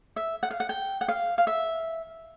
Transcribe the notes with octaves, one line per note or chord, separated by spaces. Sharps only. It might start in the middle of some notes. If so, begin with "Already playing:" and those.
E5
F#5
F5
F#5
G5
F#5
F5
F5
E5